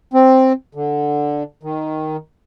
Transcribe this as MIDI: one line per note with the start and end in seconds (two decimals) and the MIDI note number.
0.14 0.53 60
0.75 1.43 50
1.63 2.17 51